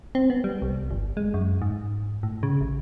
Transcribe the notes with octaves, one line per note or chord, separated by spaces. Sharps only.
C4
B3
G3
C2
G1
G#3
F#2
G#2
A2
C#3
A1